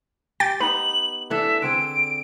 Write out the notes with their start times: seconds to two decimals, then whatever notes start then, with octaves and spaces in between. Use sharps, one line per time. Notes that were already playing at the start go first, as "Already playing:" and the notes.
0.40 G4 G5 A6
0.60 B3 D#4 B4 F#7
1.30 E3 D4 A4 E5
1.62 D3 C4 G#4 D7